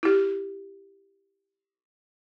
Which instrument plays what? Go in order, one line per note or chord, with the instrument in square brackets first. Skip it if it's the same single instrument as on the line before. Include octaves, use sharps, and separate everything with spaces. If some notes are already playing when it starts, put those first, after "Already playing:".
[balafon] E4 G4